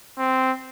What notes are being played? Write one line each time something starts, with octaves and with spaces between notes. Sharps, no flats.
C4